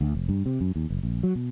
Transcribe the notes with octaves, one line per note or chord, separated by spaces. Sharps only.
D2
F1
G2
C3
F#2
D#2
F#1
A#1
F#3
B2